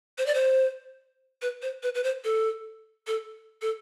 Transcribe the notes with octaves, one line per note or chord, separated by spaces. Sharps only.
C5
D5
C5
B4
C5
B4
B4
C5
A4
A4
A4